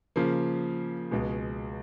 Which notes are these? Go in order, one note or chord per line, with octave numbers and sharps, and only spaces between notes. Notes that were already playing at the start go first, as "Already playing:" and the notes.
C#3 F3 A#3
C#2 B2 G#3